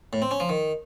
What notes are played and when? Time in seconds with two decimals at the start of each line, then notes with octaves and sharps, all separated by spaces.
0.13 A2
0.22 C4
0.31 C#4
0.40 F3
0.49 D#3